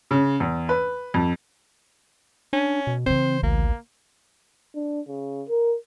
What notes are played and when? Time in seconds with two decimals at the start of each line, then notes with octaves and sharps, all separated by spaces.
0.11 C#3
0.40 E2
0.69 B4
1.14 F2
2.53 C#4 D4
2.87 B2
3.06 C#3 E3 C4 C5
3.43 A1 D2 A#3
4.74 D4
5.07 C#3
5.48 A#4